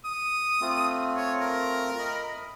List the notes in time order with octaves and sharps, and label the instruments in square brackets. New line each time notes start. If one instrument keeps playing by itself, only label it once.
[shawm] D#6
[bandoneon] A3 C4 F4
[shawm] C#5
A#4
[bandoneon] D#5 B5